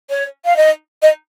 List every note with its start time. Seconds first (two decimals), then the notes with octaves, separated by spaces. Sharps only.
0.10 C#5
0.45 F5
0.57 D#5
1.02 D#5